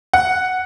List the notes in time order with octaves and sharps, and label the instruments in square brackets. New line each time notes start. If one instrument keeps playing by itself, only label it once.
[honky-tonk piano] F#5